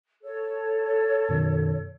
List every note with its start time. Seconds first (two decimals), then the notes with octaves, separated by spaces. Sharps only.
0.23 A4 C#5
1.29 F#2 B2 D#3